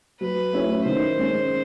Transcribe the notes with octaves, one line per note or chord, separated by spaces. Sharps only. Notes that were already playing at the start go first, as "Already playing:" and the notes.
F#3 B4
A3 C#4 E4
D#3 C5
G#3 C#4